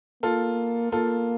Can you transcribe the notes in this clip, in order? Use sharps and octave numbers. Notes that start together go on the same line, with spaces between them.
A#3 F4 A4
A#3 F4 A4